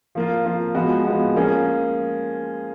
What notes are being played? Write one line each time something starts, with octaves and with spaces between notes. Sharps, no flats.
F3 A#3 F4
F3 A#3 F4
F3 G#3 B3 F#4
F3 G#3 B3 F#4
F3 A#3 C#4 G#4